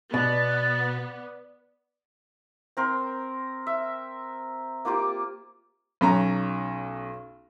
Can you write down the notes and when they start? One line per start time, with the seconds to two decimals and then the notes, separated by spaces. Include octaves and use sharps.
0.14 B2 B3 D5 A6
2.77 C4 A#4 C6
3.67 E5
4.85 A#3 F4 G4 D6
6.01 B1 C#4 A#5